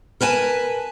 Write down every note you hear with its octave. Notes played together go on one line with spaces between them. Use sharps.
A#4 B4 G#5 A5